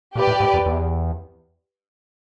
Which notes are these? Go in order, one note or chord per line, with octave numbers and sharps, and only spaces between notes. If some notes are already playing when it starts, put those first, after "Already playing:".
A#2 G4 B4 D5
A2
G#2
F2
E2